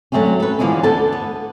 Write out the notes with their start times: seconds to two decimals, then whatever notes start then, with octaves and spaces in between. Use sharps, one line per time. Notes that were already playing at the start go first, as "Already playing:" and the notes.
0.12 D3 F#3 G3 A3 C4 C#4
0.40 A4 B4
0.59 D3 E3 F3 G#3 C#4
0.83 D2 D3 B3 A4 A5
1.12 B3